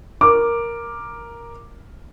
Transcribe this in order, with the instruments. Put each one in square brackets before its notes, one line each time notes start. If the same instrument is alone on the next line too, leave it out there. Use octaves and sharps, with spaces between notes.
[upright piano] A#4 D6